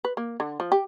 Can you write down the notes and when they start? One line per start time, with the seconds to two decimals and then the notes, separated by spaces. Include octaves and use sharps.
0.05 B4
0.17 A#3
0.40 D3
0.60 F3
0.72 G4